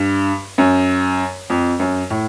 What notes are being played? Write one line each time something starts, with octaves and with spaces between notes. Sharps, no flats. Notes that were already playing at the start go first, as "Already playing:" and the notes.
Already playing: G2
F#2
F2
F#2
A2